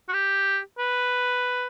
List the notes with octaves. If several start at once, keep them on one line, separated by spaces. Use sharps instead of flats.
F#4
G4
B4